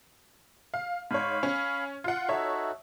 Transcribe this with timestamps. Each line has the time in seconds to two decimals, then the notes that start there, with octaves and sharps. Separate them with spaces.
0.74 F5
1.11 G#2 C#5 F5 B5
1.43 C#4
2.04 F4 F#5
2.29 D#4 F#4 A4 C#5 E5